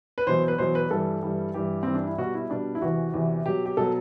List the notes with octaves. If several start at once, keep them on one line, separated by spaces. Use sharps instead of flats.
B4
E2 B2 F#3 C5
B4
E2 B2 F#3 C5
B4
G2 E3 G3 A4
G2 E3 G3
G2 E3 G3 G4
G2 E3 G3 C4
D4
E4
B2 G3 F#4
E4
B2 G3 D4
E4
E2 C3 E3 F#4
E2 C3 E3
B2 F#3 G4
G4
B2 F#3 A4